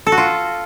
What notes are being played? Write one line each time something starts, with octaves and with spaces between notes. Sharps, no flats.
A4
F#4
F4